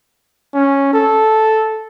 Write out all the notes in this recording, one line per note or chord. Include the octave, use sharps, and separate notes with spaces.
C#4
A4